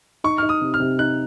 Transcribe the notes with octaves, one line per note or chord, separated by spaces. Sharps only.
D#4 C#6
D#4 F6
D#6
C3
F6
C3
D#4 F#6